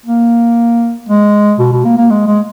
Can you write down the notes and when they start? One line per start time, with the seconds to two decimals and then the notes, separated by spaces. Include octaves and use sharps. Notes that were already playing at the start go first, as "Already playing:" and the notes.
0.06 A#3
1.09 G#3
1.59 B2
1.72 B2
1.85 A#3
1.98 A#3
2.10 G#3
2.27 G#3